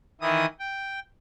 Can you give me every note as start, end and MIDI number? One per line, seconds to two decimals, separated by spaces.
0.21 0.46 51
0.21 0.46 52
0.21 0.46 64
0.21 0.46 87
0.60 1.00 79